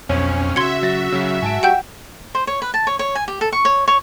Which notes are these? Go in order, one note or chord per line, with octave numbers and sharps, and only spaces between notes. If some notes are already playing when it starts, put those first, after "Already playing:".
B1 F2 C4 C#4
C#3 F#4 E5 C6 G#6 C#7
F#3 A6 A#6
C#3 F#3
G#2 G#5 A5 D7
G3 F#5 G5 G6
C5
C#5
B4
A5
C#5
C#5
G#5
G4
A4
C#6
C#5
C#5